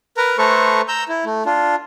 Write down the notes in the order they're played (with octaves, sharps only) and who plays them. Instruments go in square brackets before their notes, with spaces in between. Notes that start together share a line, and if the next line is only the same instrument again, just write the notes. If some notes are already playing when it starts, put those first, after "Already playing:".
[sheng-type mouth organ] A#4 B4 A#5
A3 A4 B4 C5 A#5 C#6
A#5 E6 G6
E4
A3
D4 F4